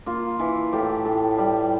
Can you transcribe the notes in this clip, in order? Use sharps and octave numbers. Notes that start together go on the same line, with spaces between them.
A#3 F4
E3
A2 G4
A2
G3